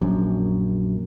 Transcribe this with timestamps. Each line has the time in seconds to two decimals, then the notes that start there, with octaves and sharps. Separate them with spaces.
0.02 A#1 F#2